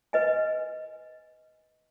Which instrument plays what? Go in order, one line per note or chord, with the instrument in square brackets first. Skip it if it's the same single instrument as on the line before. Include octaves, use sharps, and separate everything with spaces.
[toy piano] B4 D#5 G#5